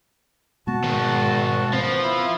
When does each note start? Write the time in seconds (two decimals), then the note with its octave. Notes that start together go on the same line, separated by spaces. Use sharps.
0.67 B2 G#3 B3 F#4 A5
0.84 G#2 D#3
1.73 F3 B3 C4
2.03 E4